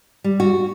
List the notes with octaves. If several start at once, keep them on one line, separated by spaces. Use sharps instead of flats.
G3
F#4